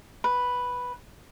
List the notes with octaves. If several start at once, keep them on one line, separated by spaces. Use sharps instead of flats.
B4